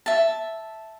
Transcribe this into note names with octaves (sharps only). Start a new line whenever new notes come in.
E5 A5